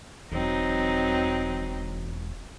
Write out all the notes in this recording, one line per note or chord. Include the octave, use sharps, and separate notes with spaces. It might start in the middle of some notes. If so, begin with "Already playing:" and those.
E1 F#3 C4 D#4